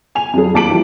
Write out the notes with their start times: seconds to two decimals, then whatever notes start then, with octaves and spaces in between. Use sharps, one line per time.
0.15 G#5 F7
0.33 F2 F#3 G#4
0.54 D#2 A5 D6 D7 F#7
0.69 E3 F3 G3 E4 G4